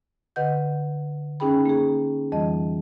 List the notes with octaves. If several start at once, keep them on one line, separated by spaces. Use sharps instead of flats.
D3 B4 D#5 F#5 G6
C#4 D#4 G#4 G5 B5
A#3 G#4
F2 E3 G3 D#5